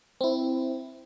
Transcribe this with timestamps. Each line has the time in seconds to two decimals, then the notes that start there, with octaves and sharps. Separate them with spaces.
0.21 C4 E4